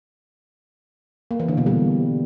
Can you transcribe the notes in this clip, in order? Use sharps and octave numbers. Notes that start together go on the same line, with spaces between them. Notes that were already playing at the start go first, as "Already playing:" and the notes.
A#3
E3
D3
B2
G3